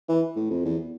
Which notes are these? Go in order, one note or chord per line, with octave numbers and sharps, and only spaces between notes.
E3
A2
F2
E2